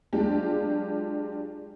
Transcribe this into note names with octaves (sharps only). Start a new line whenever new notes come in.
F#3 G#3 D4 F4 G4